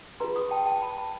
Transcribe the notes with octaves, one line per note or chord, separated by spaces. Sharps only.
F4 G#4 B4 A#5 C6
C#6 D#6
G5 A5
G5 A5
A5 B5
A5 B5